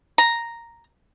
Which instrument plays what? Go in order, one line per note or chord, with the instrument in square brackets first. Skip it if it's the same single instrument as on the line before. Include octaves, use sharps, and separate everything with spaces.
[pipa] A#5